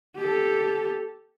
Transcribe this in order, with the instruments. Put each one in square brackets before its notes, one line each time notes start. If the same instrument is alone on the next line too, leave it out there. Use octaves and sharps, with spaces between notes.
[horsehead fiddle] G4 A4